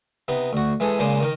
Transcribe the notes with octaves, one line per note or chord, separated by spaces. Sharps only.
C3 B3 D#4
D2 F#4
E3 G#3 G#4 A4
A#2 C#3 G#3 C5 D6 D#6
D#3 D#4 A#4